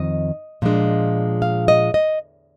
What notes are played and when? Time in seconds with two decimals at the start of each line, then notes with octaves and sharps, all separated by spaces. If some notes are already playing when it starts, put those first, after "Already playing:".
Already playing: F2 D#3 D#5
0.62 A#2 F3 G#3 D4
1.42 F5
1.68 D#5
1.94 D#5